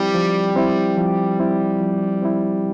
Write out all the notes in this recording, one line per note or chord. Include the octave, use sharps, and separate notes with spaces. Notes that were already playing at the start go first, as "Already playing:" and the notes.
Already playing: F3 G3 C4 E4
F3
C4 E4
F3
C4 E4
F3
C4 E4